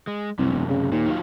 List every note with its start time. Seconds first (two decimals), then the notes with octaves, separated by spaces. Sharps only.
0.07 G#3
0.39 C2 F#2 C3
0.52 E1
0.69 C#3
0.92 D#2 A#2
1.06 D#3 F#3 F4